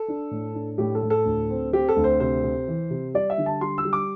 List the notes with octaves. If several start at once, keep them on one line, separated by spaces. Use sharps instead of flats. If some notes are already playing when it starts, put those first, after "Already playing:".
Already playing: A4
D4
A2
D4
A2 G4
A4
A2
A4
D2
C4
C4 G4
A4
D2
C5
C3 C5
C3
E3
C3
G3 D5
E5
D3
A5
G3 C6
E6
G3
D6